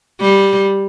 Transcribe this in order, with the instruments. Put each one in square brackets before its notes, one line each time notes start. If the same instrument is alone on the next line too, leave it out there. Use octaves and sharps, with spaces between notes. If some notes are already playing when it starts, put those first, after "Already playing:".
[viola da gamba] G3